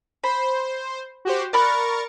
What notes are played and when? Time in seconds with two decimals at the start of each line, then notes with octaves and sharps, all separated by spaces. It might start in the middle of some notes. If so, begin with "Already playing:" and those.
0.24 C5 B5
1.25 F#4 G4 C5
1.53 A#4 D5 B5 C#6 F#6 A6